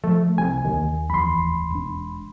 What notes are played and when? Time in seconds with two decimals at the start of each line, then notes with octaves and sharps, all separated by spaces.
0.04 F3 A3
0.38 C2 G#5
0.65 D#2 D#3
1.10 F1 E2 B5 C6
1.71 E1 D4